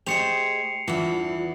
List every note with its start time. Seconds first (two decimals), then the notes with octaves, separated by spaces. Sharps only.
0.06 A3 G4 G#4 C5 D#5 C7 C#7 F7
0.88 E2 G2 E3 B3 E4 F4